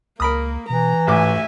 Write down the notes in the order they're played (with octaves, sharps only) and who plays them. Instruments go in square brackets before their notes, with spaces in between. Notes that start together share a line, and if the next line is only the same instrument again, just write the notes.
[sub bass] C#2 [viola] A#3 [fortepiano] A#4 B5 D#6
[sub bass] B2 [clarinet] E3 [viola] A#5
[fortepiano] A1 D2 D6 [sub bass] G#2 [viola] E5 G#5